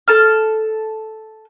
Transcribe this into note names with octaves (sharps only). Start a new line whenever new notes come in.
A4 A5 F6